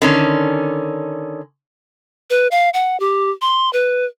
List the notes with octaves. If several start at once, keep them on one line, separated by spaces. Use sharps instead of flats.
D3 D#3 C#4
B4
F5
F#5
G4
C6
B4